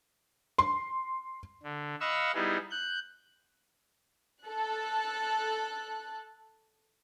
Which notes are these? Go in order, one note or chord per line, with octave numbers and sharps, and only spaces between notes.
C6
D3
D#5 F5 F#5 B5 C#6 E6
G3 B3 D#4 E4 G#4
F#6 G6
A4 F#6